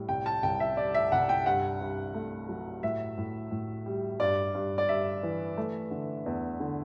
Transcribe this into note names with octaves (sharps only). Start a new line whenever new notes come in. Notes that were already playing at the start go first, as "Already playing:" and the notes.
Already playing: A2 G3
C2 G5
A5
C2 G5
E5
G3 D5
E5
C2 F#5
G5
G2 F#5
G2
A3
F#3
A2 E5
A2
A2
G3
G2 D5
G2
D5
G2 E5
E3
A3
D3
E2
D3